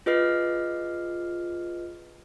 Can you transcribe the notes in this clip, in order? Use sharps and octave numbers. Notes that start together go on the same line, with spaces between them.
F4 G#4 B4 D#5 F6 C7